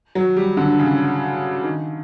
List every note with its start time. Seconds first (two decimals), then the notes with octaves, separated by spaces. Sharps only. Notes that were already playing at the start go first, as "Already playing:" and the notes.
0.15 F#3
0.36 G3
0.57 D3
0.79 C#3
1.63 D#3